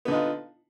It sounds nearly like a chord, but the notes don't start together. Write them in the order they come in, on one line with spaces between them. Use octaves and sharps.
B3 D3 D#4 F4